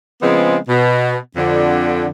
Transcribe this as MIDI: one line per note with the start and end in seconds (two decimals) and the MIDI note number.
0.22 0.56 49
0.22 0.56 53
0.22 0.56 56
0.22 0.56 59
0.22 0.56 60
0.68 1.15 47
1.36 2.07 41
1.36 2.07 50